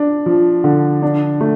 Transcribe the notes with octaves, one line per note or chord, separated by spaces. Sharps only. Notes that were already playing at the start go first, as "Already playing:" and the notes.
Already playing: D4
F3
D3
D4
A3